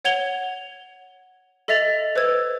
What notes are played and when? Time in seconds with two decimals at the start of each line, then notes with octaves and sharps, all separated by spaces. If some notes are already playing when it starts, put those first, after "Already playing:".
0.04 C#5 F#5 G#6 F7 G7
1.68 A4 D#5 E5 A6 F7
2.16 B4 C5 E6 G#6